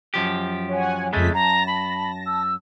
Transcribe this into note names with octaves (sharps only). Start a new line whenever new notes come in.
F#2 F3 G4
C#5 F#5 G#5
F2 C#3 G#3 A3 B6
F#2 A5 A#5 A#6
B5
E6